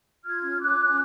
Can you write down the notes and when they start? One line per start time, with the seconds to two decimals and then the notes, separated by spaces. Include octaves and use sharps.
0.25 F4 F6 G#6
0.43 C#4
0.61 C#4 D6 F#6
0.79 C#4